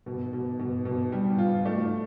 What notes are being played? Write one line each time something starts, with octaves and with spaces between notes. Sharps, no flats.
B2
B2
B2
B2
G3
F4
A3